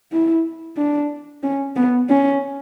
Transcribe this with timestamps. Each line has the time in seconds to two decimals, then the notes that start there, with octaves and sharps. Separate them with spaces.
0.12 E4
0.77 D4
1.43 C#4
1.76 B3
2.09 C#4